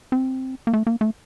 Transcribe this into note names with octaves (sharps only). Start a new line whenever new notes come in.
C4
A#3
A3
A#3
A3